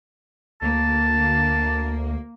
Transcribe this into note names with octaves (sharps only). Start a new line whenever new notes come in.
D2 A#3 A5